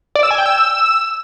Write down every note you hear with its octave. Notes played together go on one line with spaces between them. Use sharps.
D5
E6
G#5
G5
E6